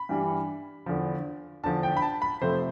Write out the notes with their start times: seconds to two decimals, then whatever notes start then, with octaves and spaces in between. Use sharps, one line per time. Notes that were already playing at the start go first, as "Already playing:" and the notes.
Already playing: B5
0.09 G2 E3 G3
0.86 E2 D3 F3
1.63 E2 D3 F3 A5
1.83 G5
1.97 B5
2.02 A5
2.22 B5
2.41 F2 C3 F3 A3 C5